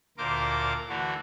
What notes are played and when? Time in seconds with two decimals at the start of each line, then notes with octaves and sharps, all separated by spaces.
0.18 D2 A#2 A#3 A#4 C5 D6
0.89 D3 E3 A3 F#4